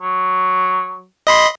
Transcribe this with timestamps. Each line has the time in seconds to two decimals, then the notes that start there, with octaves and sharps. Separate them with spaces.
0.02 F#3
1.27 D#5 B5 C6